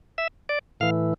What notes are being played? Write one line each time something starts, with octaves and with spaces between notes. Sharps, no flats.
E5
D5
A2 E3 F5